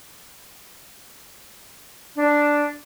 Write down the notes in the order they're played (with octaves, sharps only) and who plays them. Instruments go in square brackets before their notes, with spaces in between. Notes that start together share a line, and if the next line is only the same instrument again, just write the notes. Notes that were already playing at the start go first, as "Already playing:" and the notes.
[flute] D4